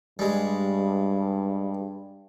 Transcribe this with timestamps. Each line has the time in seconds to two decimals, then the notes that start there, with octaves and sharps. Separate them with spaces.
0.19 G2 G3 G#3